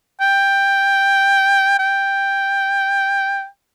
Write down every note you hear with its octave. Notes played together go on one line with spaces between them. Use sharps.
G5
G5